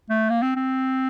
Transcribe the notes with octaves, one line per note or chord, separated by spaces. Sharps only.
A3
A#3
C4
C4